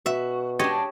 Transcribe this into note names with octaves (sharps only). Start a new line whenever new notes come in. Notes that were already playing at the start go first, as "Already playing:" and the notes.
B2 F#4 E5
G#3 D4 G4 C#5 D#5